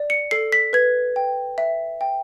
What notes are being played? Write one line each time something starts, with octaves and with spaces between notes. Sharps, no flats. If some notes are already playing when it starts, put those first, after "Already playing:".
Already playing: D5
C#7
A4 C7
B6
B4 G#6
G5
E5
G5